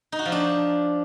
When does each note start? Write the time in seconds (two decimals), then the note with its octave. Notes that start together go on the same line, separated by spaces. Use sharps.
0.12 D#4
0.19 F#4
0.25 F3
0.32 D4